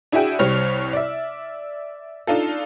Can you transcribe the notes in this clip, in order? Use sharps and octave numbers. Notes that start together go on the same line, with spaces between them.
D4 E4 F#4 G#4 E5 G5
C2 G3 C4 C#5 F6
D5 E5
D4 D#4 F4 A4